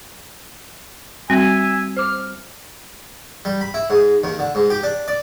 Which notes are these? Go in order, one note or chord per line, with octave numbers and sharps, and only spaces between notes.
G3 C4 F#4 E5 G#5
C5 D6 F6
G3
B5
E4
G#2
D#2
D3
G#2
G4
D4
D5